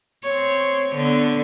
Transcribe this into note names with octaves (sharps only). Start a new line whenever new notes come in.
C4 C#5
D3 B3